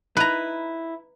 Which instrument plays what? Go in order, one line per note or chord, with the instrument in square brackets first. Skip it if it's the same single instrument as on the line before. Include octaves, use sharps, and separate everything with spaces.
[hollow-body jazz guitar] D#4 E4 [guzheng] B4 A#5